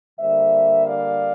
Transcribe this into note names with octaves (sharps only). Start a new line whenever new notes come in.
D3 G3 A#3 C5 E5
D5 F5